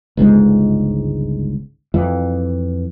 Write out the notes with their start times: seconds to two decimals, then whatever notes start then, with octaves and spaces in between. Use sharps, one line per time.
0.17 G1 C#2 G#2 G#3
1.94 F2 E3